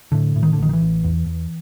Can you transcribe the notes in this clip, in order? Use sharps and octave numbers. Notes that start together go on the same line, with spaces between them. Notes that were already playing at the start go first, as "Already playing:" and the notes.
A2 D3
A2
D#3
D3
A1 D#3
D#3
E3
A1
E2
E2